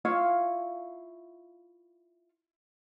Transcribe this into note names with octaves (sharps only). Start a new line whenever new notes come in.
E4 F4 C#5 F5